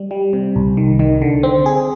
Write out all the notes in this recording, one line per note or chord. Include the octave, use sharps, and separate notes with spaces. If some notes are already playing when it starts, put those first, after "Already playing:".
Already playing: G3
G3
C3
C2
D#3
D#3
D3
C4
G#4